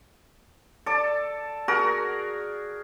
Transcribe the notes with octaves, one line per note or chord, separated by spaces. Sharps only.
A4 D5
F#4 G#4 A#4